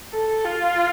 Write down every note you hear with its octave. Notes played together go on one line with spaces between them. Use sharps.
A4
F4